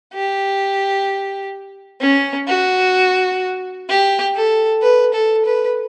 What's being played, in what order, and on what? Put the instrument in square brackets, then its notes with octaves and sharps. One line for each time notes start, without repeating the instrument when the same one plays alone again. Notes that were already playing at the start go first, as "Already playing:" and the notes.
[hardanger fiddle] G4
C#4
F#4
G4
A4
B4
A4
B4